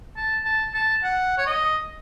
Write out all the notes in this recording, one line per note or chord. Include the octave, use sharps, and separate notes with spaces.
A5
A5
A5
F#5
C#5
D#5